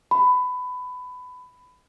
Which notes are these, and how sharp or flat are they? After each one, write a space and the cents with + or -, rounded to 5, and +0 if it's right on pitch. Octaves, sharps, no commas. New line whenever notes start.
B5 +20